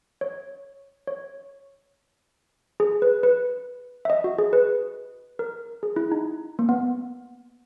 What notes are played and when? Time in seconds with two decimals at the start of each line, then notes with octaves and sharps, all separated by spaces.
0.21 C#5
1.07 C#5
2.80 G#4
3.02 B4
3.23 B4
4.05 E5
4.10 D#5
4.24 F#4
4.38 G#4
4.53 B4
5.39 A#4
5.83 G#4
5.96 E4
6.12 D#4
6.59 A#3
6.69 B3